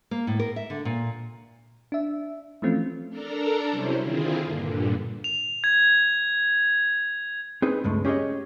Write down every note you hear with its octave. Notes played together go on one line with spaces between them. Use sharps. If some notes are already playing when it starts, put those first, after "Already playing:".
A#3
A2
A#4
E5
D3
A#2
D4 E5
E3 F3 A3 C4 C#4 F4
D4 A4 A#4 A#5
C3 F#3 G3 C#4 E4 C5
D3 D#3 C4 E4 F4 G#4
G2 A#2 D3
F7
G#6
C4 D#4 G#4 B4
C#2 G2 G#3 A3
C#4 G4 G#4 C5 C#5 D#5